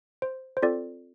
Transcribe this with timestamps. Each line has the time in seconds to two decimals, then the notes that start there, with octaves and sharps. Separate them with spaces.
0.22 C5
0.57 C5
0.63 C4 F4 A4 D5